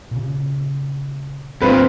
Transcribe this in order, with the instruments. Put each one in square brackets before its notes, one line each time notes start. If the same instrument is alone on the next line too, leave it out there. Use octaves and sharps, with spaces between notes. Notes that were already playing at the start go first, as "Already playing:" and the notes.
[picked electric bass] A#2 C#3
[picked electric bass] G#1 F#3 [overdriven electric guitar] G2 A#2 [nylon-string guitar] C4 F4 [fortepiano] B4